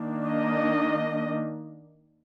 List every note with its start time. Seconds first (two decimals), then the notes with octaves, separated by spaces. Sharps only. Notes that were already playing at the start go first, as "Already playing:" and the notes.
Already playing: D#3 A#3 D4
0.26 D#5